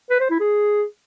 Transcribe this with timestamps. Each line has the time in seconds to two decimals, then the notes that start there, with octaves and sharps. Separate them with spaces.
0.10 B4
0.20 C5
0.30 E4
0.40 G#4